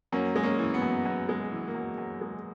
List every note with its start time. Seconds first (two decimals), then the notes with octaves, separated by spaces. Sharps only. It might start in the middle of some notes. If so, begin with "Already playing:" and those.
0.12 F#2 A#3 C#4
0.36 G#3
0.43 A#3 C#4
0.59 E3
0.74 B3
0.82 F#2
1.05 F#2 B3
1.29 G#3
1.52 E3
1.68 A#3
1.75 F#2
1.98 F#2
2.21 G#3